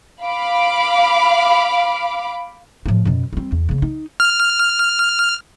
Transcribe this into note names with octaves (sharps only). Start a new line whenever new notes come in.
F5 B5 D6
A2 F3
F#2 B2
G3 C4
E2
C#3 A#3
D#4
F6